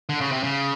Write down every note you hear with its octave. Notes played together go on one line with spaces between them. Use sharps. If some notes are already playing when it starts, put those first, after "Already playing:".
D3
C#3
C3
C#3